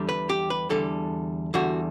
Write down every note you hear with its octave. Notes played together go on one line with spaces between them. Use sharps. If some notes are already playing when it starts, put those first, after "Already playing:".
Already playing: E2 D3 G3
B4
G4
B4
E2 D3 G3 A4
E2 D3 G3 F#4